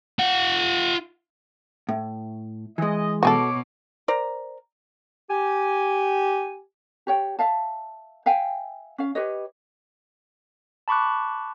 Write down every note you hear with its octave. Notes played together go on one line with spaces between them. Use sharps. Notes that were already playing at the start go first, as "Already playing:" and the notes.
F4 F#5
A2
E3 G#3 D#5
B2 F#4 G#4 A4 C#5 D6
A#4 C5 D5 A#5
G4 G#5
G4 C#5 G5
E5 F5 A5
E5 F5 G5 G#5
C#4 F5
G4 B4 C#5 D#5
A5 B5 C#6 D6 F#6